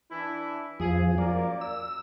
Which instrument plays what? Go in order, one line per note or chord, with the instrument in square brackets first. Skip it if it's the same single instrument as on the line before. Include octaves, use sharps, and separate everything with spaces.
[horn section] E3 D4 E4
[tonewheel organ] F2 F3 [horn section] G#4
[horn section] F#2 A#2 A#3 [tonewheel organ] D5
[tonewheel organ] E6